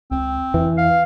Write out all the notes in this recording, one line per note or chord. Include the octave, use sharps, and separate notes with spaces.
C#2 C4
F2 E3
F5